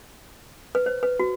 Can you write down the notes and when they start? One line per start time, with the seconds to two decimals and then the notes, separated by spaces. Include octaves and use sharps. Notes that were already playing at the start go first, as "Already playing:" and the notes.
0.75 B4
0.86 C5
1.03 B4
1.19 F#4